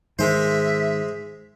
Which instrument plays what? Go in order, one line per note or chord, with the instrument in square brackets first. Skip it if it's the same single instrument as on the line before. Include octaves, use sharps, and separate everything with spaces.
[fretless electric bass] G#2 D#3 [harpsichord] G#3 C5 [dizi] E5